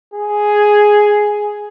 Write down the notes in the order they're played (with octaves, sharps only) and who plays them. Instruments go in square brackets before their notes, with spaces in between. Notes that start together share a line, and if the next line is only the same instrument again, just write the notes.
[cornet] G#4